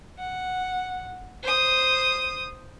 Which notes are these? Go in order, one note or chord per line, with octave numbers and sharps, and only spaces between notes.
F#5
C5 D#6